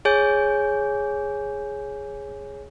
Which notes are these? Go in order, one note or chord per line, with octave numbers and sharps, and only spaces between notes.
G#4 C#5 G#5 G6